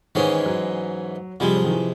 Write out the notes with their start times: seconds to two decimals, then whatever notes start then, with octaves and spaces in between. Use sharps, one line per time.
0.15 G#2 D#3 E3 G#3 C#4
0.46 F#3
1.40 C3 F3 G3 G#3
1.56 F#3
1.64 D#3
1.71 E3